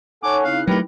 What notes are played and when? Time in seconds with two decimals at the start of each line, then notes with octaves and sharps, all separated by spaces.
0.23 D#4 A4 C#5 F#5 G#5 C#6 D6
0.44 C#3 C4 D#4 E4 F5 F#6
0.67 D#3 F#3 A3 G4 A#4 B4